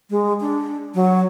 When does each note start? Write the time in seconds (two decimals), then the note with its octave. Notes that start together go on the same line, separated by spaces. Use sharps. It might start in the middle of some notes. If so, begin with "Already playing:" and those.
0.10 G#3
0.41 D4
0.95 F#3